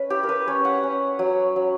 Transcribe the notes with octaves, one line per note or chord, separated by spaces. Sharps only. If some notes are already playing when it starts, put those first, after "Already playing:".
Already playing: C#4 B4
E4 G4
A#4
B4
C#4 C#5
F#5
C#4
F#3
F#3